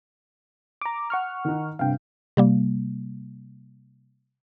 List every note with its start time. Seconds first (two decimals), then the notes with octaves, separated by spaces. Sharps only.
0.82 A#5 D6
1.10 F#5 C#6 F6
1.45 D#3 D#4
1.79 G2 C3 F5 G5
2.37 C3 G3 A#3